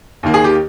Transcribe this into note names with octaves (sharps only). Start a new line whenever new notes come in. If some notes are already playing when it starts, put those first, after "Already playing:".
D#2 D#3 A#3
G#4
G4